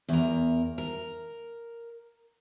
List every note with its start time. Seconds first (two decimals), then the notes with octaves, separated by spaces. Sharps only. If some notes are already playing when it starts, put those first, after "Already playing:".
0.09 E2 A#4
0.78 A#4